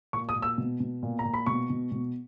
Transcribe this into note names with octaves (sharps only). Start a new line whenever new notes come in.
A#2 C#6
D#6
A#2
E6
B2
B2
A#2
A#5
A#2
B5
B2 C#6
B2
B2